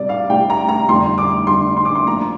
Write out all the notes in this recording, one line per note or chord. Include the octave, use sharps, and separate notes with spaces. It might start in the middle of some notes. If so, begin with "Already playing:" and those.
Already playing: C2 C3 G3 D5
F5
C2 C3 G3 G5
A#5
A#5
G1 F2 D3 G3 D4 C6
D6
G1 F2 D3 G3 D4 C6
C6
D6
C6
F2 F3 A#3 D4 A#5